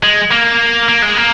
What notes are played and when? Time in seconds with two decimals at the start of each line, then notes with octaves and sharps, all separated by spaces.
0.03 G#3
0.31 A#3
0.89 A#3
1.02 G#3
1.17 A#3